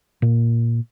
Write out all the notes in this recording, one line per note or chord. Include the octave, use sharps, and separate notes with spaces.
A#2 A#3